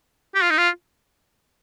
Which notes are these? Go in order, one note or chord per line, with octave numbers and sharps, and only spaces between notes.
G4
F4
D#4
F4